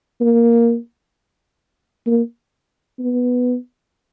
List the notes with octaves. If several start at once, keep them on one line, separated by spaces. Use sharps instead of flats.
A#3
A#3
B3